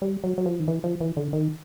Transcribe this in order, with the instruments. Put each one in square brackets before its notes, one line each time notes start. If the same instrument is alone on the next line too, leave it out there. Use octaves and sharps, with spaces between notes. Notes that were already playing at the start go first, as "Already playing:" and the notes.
[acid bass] G3
F#3
F#3
F3
D#3
E3
F3
E3
D3
D#3